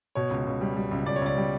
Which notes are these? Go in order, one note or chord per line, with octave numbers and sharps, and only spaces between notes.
B2 C#5
C#2
C#2
G3
G3
C#2
C#2 D5
C#5
C#2 D5
G3